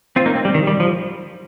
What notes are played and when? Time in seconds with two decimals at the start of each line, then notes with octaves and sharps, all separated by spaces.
0.16 C4 F4
0.26 A#3 D#4
0.35 C4
0.45 G3
0.54 D#3
0.67 G3
0.80 F3